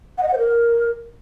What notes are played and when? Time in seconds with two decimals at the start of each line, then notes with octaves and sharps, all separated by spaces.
0.18 F#5
0.23 D#5
0.28 F#5
0.33 C5
0.38 A#4